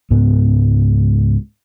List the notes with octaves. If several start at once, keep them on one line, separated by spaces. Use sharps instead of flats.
C#2 G#2 B3